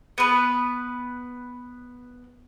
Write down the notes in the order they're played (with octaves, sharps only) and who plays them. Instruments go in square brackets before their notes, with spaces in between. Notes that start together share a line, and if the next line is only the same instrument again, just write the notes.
[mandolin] B3 B4